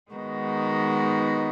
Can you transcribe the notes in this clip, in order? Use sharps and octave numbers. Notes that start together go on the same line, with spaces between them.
D#3 G#3 B3 D#4 F#4